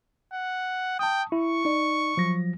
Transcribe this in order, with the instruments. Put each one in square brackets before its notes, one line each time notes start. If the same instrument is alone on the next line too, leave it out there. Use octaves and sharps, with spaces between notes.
[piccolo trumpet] F#5
[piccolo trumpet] G5 [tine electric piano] A5 D#6
[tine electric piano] E4 [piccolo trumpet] C#6
[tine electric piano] D#4 D5
F3 F#3 A#6